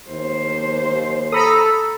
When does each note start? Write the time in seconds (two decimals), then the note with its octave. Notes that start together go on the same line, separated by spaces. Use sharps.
0.10 D#2 C5
1.32 A4 A#5 B5 D#6